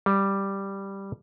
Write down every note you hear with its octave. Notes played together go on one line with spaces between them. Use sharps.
G3